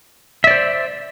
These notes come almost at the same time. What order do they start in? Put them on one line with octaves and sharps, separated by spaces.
E5 D5 C5